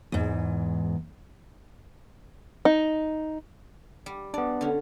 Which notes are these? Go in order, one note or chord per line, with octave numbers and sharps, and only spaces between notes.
E2 G#2
D#4
G3
B3 D4 D5
D3 C#4